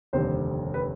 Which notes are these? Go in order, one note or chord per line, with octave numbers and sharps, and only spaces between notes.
F1 D#2 D3 G3 C4 C5
B4